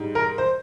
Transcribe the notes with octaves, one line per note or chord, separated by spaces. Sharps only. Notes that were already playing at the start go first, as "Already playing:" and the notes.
Already playing: G#2 G3
A#4
C5